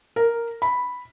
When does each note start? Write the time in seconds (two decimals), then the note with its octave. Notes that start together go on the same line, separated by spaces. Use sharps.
0.16 A#4
0.62 B5